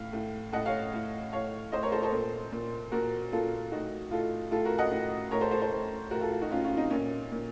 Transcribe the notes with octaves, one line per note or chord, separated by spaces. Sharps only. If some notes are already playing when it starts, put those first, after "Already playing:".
Already playing: A2 F5
A2
A2 D#5 F#5
C#5 F5
A2
A2 C#5 F5
A2 C5 D#5
A#4 C#5
A4 C5
A4 C5
A#2
A#2
A#2 F#4 A#4
A#2 F4 A4
A2 D#4 F#4
A2 F4 A4
A2 F4 A4
F#4 A#4
D#5 F#5
A2
A2 A#4 C#5
A4 C5
A4 C5
A4 C5
A2
A2 F#4 A#4
F4 A4
F4 A4
D#4 F#4
A2 C#4 F4
C#4 F4
C4 D#4
A#2 C#4
A#2